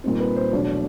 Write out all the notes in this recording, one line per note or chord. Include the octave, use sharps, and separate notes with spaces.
A#2 G3 C4 D#4
B4
C5
E2 B2 F#3 A3 D4 C#5